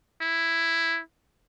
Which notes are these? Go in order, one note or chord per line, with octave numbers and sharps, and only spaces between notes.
E4